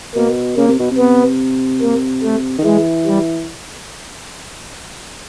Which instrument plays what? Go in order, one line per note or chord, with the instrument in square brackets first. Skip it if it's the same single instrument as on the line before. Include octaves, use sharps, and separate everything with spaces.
[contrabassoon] B2 [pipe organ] A#3
[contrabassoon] C#3 [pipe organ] A#3
[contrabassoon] C3
B2
C3
[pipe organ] B3
A#3
A3
[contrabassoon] D#3
[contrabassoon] E3 [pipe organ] G#3
[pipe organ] G3